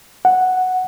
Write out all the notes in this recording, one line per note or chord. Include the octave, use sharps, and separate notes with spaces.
F#5